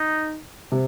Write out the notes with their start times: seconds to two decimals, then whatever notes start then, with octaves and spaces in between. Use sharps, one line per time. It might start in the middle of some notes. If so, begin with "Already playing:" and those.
Already playing: D#4
0.72 C3